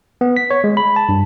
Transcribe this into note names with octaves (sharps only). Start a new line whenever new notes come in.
B3
B6
C#5
G#3
B5
A5
G2